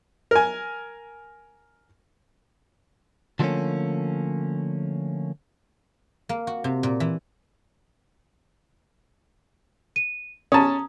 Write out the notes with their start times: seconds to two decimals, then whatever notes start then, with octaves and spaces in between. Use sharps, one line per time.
0.31 A#4 G#5
3.39 D3 F3 G3 A3 A#3 C#4
6.29 A#3
6.47 F#4
6.64 C3
6.83 A#2
7.00 E3
9.96 D#7
10.52 C#4 A5 A#5 D#6